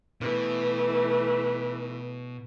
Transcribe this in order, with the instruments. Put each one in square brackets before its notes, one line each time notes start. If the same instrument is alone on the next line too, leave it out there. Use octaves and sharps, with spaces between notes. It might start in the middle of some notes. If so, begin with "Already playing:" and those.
[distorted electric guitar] B2 [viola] E3 A3